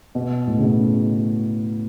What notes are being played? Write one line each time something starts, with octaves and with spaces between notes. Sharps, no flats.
B2
A2
C#3
B2